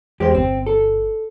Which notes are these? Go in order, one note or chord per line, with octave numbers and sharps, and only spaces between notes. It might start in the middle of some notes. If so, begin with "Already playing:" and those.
E2 G#3 G4 C5
G1 C4
A4